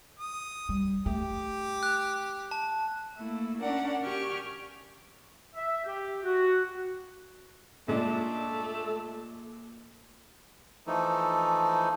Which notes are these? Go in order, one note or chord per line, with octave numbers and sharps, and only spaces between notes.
D#6
G3
A3 G4
F#6
A5
A3 A#3 E4
C#4 D4 A#4 D5 F#5
G4 G5 G#5 C#6 F6
E5
G4
F#4
A#2 G#3 A3 D4
E3 F3 A3 D#4 A4